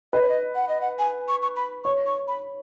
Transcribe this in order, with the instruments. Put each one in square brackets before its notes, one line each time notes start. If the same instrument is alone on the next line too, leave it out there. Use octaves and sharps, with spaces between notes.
[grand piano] B4 [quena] D#5
[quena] C#5
D#5
F#5
D#5
F#5
G#5
C#6
C#6
B5
[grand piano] C#5 [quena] C#6
[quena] C#6
B5